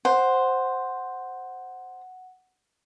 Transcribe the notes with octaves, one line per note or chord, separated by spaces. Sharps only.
C5 F#5